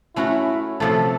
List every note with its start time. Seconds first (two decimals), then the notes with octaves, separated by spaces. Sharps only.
0.16 A3 C#4 E4 F#4 A#4
0.80 C3 F3 A3 A4